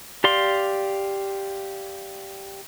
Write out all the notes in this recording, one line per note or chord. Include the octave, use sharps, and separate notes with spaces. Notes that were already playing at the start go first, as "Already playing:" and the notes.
G4 D5 F5 C6